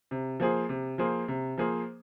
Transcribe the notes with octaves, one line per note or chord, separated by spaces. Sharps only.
C3
F3 A#3 G#4 C5
C3
F3 A#3 G#4 C5
C3
F3 A#3 G#4 C5